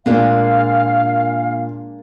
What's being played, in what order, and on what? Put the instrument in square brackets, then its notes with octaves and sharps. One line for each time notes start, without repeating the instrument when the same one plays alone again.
[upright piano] A#2 [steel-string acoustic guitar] G#3 A#3 D4 [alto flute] F5